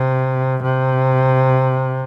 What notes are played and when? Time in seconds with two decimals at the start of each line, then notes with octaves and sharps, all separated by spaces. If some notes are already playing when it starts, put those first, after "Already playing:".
Already playing: C3
0.63 C3